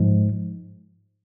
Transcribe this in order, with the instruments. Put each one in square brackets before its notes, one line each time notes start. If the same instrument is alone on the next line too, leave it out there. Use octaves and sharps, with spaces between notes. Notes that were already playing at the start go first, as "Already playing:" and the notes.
Already playing: [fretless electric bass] G#2 F3 G#3